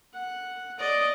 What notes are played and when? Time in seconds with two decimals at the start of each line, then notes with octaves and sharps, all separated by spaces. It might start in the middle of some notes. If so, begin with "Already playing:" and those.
0.14 F#5
0.78 D5 D#5